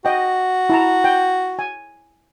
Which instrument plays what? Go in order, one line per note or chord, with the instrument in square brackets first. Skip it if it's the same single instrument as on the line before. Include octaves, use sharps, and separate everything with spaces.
[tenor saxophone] F#4 [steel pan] D#5 G5
[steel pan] E4 A5 A#5
G5
G#5